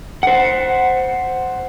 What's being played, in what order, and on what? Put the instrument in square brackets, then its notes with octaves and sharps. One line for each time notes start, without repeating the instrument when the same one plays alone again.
[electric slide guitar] C5 F#5